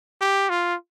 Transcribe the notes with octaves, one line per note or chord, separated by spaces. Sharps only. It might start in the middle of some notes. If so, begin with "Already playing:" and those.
G4
F4